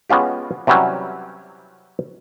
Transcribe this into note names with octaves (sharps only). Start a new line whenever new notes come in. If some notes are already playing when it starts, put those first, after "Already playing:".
G#3 B3 C#4 F4 G4
C3 E3 F#3 G3 C#4